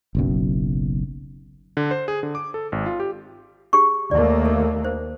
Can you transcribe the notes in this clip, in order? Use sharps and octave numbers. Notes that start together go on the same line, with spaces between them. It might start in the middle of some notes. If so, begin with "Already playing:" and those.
F#1 B1 F#2
D3
C5
G#4
D3
D6
A4
G#1
F4
G4
G4 G#4 C#6
D#2 A3 A#3 D5
A4
C5